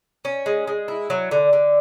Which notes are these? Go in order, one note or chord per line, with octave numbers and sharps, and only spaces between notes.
C#4
G#3
G#3
E4
F#3
D3
D3